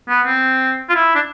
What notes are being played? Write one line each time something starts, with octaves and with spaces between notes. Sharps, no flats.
B3
C4
F4
E4
D4